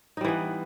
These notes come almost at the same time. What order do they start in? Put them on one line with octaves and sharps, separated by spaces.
D#4 G3 E3 B3